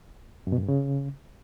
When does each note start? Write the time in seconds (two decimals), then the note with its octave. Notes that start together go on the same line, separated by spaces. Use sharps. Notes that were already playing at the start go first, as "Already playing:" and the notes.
0.47 F#2
0.52 B2
0.58 F#2
0.63 G2
0.68 C#3